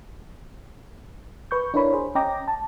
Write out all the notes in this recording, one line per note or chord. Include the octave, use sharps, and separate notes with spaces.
B4 C#6 G6
D4 E4 A#4 B4 C#5 B5
G#4 C5
C#4 D#5 G5 A#5 D6 A#6
A5